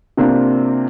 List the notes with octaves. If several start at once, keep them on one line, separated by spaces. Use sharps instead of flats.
C3 A#3 C4 D4 F4